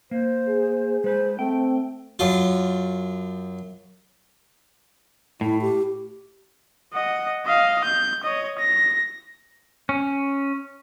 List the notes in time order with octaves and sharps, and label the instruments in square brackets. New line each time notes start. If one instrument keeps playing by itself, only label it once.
[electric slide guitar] A#3 [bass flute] C5
[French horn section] G#4
[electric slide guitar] G#3 B4 [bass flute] C5
[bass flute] A3 [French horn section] C4 [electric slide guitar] G5
[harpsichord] F#2 F4
[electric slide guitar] A2 [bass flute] E4
[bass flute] G4
[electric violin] D#5 F#5
D#5 F5
G6
C#5 D#5
A#6
[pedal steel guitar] C#4